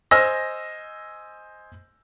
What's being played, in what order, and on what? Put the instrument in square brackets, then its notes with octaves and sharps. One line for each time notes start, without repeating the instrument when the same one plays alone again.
[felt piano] C5 D#5 G#5 E6 F6 A#6